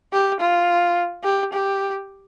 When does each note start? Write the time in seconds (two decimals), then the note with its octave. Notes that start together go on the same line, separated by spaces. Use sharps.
0.13 G4
0.40 F4
1.24 G4
1.53 G4